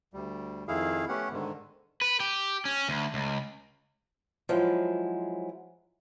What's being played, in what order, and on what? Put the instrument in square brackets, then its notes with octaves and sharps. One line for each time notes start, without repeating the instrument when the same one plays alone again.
[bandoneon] D2 G3
F2 D#3 E4 G#4 F5
A3 B3 C#4 G4 F#5
G#2 D3 D#3
[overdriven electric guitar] B4
G4
C#4
D2
C#2
[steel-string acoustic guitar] F3 F#3 G#3 E4